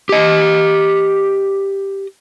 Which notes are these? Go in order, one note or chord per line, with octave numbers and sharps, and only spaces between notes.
G4 D#5